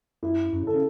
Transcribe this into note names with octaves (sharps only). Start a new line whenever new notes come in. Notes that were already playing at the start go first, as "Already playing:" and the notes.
F#2 E4
F#2
C#3
A4
C#3